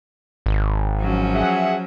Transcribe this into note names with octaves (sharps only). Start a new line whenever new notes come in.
G#1
F3 F#3 C#4
G#4 E5 F#5